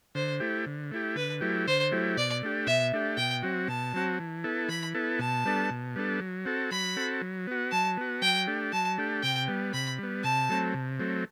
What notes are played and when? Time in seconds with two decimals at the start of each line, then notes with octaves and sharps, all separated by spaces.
0.15 D3 C5
0.40 A3 E4 G4
0.66 D3
0.91 A3 E4 G4
1.16 D3 B4
1.41 F#3 A3 E4 G4
1.67 D3 C5
1.92 F#3 A3 E4 G4
2.17 B2 D5
2.43 A3 D4 G4
2.67 B2 E5
2.93 A3 D4 G4
3.17 B2 G5
3.43 F#3 C4 F#4
3.68 B2 A5
3.94 F#3 C4 F#4
4.19 E3
4.44 B3 E4 A4
4.69 E3 B5
4.95 B3 E4 A4
5.19 B2 A5
5.45 G3 B3 D4 A4
5.70 B2
5.96 G3 B3 D4 A4
6.20 F#3
6.45 C4 F#4 A4
6.71 F#3 B5
6.96 C4 F#4 A4
7.21 F#3
7.47 B3 F#4
7.71 F#3 A5
7.97 B3 F#4
8.22 F#3 G5
8.47 A3 D4 G4
8.72 F#3 A5
8.98 A3 D4 G4
9.23 C3 G5
9.48 G3 B3
9.74 C3 B5
9.98 G3 B3
10.24 C3 A5
10.49 F#3 A3 C4
10.74 C3
10.99 F#3 A3 C4